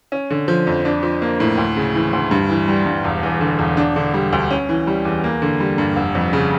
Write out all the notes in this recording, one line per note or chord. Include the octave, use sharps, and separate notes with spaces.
C#4
D3
F3
F2
D4
F3
A#3
A2
D2
C#3
E3
D2
G2
E3
G3
G2
E1
E2
D3
E1
D4
D3
G3
D2
C#4
E3
G3
E2
A#3
D3
G3
G2
F1
F2
C#3